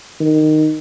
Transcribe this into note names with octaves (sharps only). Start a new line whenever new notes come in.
D#3